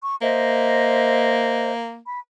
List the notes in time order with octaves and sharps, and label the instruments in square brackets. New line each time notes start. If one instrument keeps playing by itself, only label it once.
[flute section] C#6
[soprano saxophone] A#3 [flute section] C5 D#5 E5
[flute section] B5